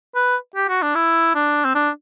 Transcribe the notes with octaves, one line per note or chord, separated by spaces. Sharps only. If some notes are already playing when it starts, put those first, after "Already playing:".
B4
G4
F#4
D4
E4
D4
C4
D4